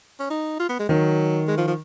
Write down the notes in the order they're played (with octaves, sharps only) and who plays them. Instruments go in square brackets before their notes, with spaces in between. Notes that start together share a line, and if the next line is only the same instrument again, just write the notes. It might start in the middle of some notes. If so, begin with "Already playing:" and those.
[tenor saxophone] C#4
D#4
F4
B3
G#3
[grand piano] D#3 [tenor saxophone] F#3
[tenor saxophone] G#3
F3
F3